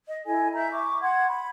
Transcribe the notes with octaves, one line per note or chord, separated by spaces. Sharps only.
D#5
E4 A4 D#5 G#5
E5 A#5 G6
C#6 D6
F#5 C6 G#6
B5